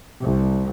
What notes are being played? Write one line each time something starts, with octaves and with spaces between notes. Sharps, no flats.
C2